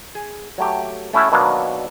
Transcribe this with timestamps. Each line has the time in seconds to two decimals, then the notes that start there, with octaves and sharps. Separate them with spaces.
0.15 G#4
0.58 F#3 A3 G4
1.13 A3 C#4 E4 F#4 E5
1.32 B2 D#3 F#3 A#3 D4